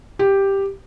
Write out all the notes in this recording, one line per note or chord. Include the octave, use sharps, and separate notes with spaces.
G4